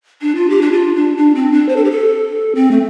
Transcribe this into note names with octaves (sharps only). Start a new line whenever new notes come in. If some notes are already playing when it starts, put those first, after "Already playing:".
D4
F4
G4
D4
F4
D4
D4
C4
D4
C5
A4
G4
A4
C4
A3